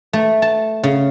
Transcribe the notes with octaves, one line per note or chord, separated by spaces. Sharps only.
A3
A5
C#3